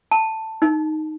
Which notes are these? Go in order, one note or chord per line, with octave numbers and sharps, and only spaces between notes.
A5
D#4